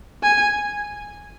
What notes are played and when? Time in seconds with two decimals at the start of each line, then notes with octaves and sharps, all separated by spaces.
0.23 G#5